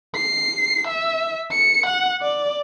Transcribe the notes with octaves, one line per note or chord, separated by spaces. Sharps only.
C7
E5
C#7
F#5
D5